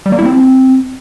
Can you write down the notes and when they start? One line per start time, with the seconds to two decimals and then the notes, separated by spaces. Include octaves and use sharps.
0.06 G3
0.12 A#3
0.19 E4
0.25 C4